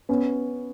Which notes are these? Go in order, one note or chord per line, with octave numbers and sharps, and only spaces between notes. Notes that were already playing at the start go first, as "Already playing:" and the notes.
B3 C#4